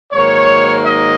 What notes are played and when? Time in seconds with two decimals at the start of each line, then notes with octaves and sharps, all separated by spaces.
0.12 G#2 D#3 F#3 A#3 C#5
0.83 D#5